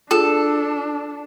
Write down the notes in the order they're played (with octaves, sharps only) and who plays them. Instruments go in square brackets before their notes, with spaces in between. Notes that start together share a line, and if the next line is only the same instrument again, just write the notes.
[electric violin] D4 [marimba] F4 G#4 [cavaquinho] A4